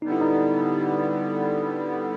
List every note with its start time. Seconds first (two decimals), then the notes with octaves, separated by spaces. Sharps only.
0.02 D3 G3 B3 D#4
0.12 E4
0.21 D#4